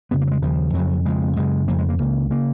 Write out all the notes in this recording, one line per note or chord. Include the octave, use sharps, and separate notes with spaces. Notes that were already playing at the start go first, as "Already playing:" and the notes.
F2 C#3 B3
A#3
F#3
G#3
D#2 C#3 F3
F2 C#3 F#3
F2 C#3 G#3
F#2 C#3 G#3
F2 C#3 A#3
G#3
A#3
C#2 C#3 A#3
C#3 A#3